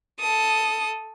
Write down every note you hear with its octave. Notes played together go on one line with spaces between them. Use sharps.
A4 D#6